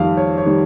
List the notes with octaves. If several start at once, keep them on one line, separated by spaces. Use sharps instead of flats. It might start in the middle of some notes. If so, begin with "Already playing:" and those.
Already playing: F2 D#3 G3 F5
C#5
C#5
D#3 G3